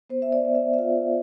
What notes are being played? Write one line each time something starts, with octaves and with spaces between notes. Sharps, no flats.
B3 C5
E5
D5
B3
E5
E5
F4 F5